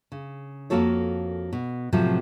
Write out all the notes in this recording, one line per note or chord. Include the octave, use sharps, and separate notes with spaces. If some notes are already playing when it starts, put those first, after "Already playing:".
C#3
F2 B2 A#3 F#4 A4 C#5
B2
A2 C3 F3 F#3 C4